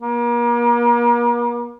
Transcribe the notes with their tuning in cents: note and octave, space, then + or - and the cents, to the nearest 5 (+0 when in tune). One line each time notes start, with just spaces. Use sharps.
A#3 +40